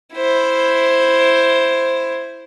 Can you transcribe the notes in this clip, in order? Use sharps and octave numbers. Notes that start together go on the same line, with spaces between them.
E4 C5